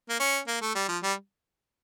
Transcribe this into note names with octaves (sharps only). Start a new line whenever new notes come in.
A#3
C#4
A#3
A3
G3
F3
G3